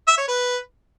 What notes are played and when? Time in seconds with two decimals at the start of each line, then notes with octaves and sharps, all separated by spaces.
0.08 E5
0.18 C#5
0.28 B4